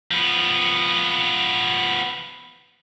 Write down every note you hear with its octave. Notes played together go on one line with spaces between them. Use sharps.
F3 B3